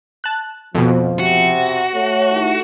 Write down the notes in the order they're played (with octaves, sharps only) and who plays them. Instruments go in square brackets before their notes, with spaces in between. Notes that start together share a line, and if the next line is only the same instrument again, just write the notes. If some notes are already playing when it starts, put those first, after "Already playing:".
[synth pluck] A5 F#6
[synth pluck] F2 B2 [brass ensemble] F3
[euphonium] C3 [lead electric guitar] F#4
[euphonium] A3 [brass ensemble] C#5
[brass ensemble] D#2 D#4 E4